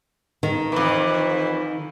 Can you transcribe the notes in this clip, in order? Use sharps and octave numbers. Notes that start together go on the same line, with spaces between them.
D#3
F2 E3